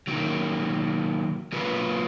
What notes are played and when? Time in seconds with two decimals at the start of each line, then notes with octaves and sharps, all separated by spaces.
0.07 D#3 F#3 A#3
1.52 F#3 A#3 F4 B4